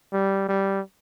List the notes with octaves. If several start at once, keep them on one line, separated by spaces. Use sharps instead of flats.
G3
G3